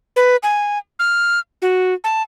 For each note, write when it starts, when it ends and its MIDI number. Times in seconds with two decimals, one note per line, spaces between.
0.16 0.36 71
0.43 0.78 80
0.99 1.39 89
1.62 1.94 66
2.04 2.22 81